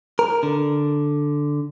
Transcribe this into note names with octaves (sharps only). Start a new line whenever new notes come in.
A#4
D3